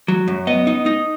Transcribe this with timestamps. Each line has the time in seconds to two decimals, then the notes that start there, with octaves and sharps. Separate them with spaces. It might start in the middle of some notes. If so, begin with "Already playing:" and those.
0.08 F#3
0.28 F#2
0.47 B3 D#5
0.67 D#4
0.86 D#4